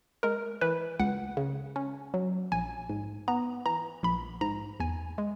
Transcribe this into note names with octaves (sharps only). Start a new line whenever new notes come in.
G#3 A#4
E3 B4
C#2 F#5
C#3
C#4
F#3
A#1 G#5
G#2
B3 A#5
E3 A#5
A#1 B5
G#2 A#5
E2 G#5
G#3